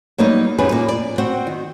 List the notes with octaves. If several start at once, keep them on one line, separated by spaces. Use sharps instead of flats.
F#3 G3 A#3 B3 D#4
F#2 G4 G#4 B4
A#2 A#3
D5
C4 F#4 F#5 G5
D#3